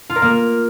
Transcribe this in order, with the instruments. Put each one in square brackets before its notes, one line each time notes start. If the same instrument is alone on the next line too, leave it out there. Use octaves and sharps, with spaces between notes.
[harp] F4
A#4
A#3